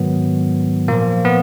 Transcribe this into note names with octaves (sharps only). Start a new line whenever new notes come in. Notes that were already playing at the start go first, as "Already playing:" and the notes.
Already playing: G#2 D#3 F#3 B3
A#2 F3 A#3
B3